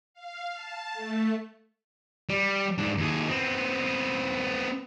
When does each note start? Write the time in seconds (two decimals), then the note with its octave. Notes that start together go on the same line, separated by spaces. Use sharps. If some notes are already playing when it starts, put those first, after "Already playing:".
0.14 F5
0.54 A5
0.93 A3
2.29 G3
2.78 G#2 D4
2.97 D#2 G#4
3.29 B3 C4